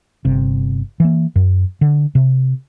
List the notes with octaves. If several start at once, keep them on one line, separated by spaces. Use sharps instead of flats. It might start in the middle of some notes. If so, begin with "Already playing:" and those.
G1 C3
E3 A#3
F#2
D3
C3